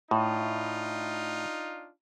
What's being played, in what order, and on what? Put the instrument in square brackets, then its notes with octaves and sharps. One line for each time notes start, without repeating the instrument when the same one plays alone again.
[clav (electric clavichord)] A2 [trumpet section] D4 D#4 F4